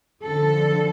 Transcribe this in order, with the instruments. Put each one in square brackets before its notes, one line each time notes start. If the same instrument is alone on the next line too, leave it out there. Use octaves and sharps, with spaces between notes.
[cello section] F2 D3 F3 A4